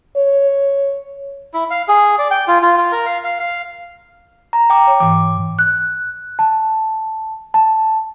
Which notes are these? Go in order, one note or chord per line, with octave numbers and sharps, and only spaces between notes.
C#5
E4
F5
G#4
D5
G5
F4
F4
F4
A#4
F5
F5
F5
A#5
G5 D6
C#5
G#2 E3 D6
F#6
A5
A5